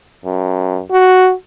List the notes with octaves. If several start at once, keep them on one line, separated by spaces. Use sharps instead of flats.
F#2
F#4